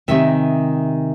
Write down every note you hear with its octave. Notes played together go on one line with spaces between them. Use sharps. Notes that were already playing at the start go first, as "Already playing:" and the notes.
C3 D#3 G#3 E5